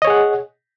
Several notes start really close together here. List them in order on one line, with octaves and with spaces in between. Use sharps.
D#5 C#5 G#4 F#5